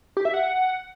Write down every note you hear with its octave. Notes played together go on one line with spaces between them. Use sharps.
G4
E5
F#5